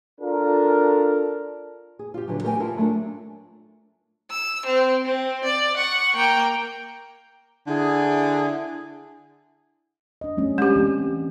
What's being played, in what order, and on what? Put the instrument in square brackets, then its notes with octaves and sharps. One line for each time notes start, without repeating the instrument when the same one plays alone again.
[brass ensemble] D4 F4 A4 A#4
[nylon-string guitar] G#4
F4 G4
D3 E3 F#3
A3 G4 A#4 C#5 G5 G#5
E4 F4 A4 A#4 A5
F#3 A3 D4
[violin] E6
C4
C4
D5
F#5 C#6
A#3 G5
[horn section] D3 E4 G#4
[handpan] D4 D#5
G3 A3 C#4
[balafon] G#3 G4 [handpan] D4
[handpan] E3 C4